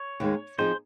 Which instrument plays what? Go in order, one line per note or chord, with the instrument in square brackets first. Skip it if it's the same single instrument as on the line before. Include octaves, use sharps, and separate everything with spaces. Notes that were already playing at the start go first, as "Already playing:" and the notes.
Already playing: [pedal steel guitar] C#5
[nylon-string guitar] D#2 D#3 G#3
[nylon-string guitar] F3 C4 D#4 G#4 [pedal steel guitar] C5